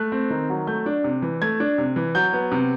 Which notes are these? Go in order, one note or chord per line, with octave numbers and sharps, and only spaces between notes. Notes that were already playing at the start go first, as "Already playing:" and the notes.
Already playing: A3 F#6
C4
D#3
F#3
A3 G6
D4
C3
E3
A3 G#6
D4
C3
E3
F#3 G6
B3
C3